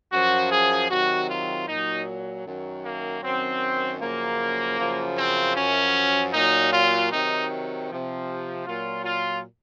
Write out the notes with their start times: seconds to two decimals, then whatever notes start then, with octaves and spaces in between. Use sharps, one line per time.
0.12 F#2 F3 F#4
0.51 G#4
0.90 C3 D#3 F#3 F#4
1.28 F4
1.67 A#2 F#3 D#4
2.45 F#2 D#3 F#3
2.84 A#3
3.23 F#2 D#3 F#3 C4
4.00 F#2 C#3 F3 A#3
4.78 F#2 C#3 F3
5.17 C4
5.56 F#2 F3 C#4
6.33 A#2 F#3 D#4
6.72 F4
7.10 C3 D#3 F#3 D#4
7.88 C3 F3
8.66 A#2 F#3 F4
9.05 F4